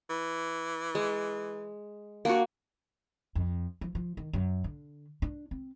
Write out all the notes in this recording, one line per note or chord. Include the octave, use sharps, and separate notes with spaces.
E3
G#3
G2 A#3 F#4
F2
F3
F3
D#3
F#2
D3
D4
C4